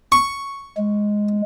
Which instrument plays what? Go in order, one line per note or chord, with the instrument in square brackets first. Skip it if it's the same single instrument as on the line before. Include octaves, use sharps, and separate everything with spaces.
[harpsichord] C#6
[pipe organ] G#3